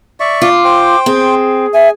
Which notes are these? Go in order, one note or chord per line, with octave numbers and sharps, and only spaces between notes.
D5 E5 C#6
F4 D6
C5 G5
C4 G#4
E5 G#5